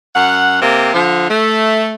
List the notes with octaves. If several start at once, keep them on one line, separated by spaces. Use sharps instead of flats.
F#2 F#5
C3 A#3 C4
D3 F3
A3